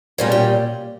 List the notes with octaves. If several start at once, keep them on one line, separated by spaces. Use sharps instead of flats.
A#2 G3 C#4 G#4
G4